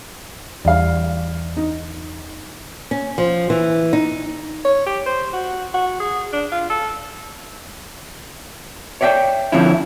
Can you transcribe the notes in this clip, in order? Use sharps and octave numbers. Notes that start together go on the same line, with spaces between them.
E2 G3 F5
D#4
C#4
F3
E3
D#4
C#5
G4
C5
F#4
F#4
G#4
D4
F4
A4
C#5 D5 E5 F#5 G5
D3 F3 C4 C#4 E4